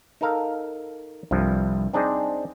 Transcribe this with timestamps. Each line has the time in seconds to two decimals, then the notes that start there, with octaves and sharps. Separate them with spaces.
0.21 D#4 A4 A#4 F5
1.31 C2 G2 F3
1.94 C4 D4 D#4 G#4 C5 D5